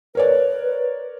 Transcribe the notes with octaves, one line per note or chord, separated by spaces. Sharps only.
A#4 B4 C#5 D5